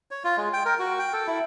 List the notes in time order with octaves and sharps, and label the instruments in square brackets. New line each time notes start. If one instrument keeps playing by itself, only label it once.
[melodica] C#5
F4
G#3
G5
A#4
F#4
G5
A4
E4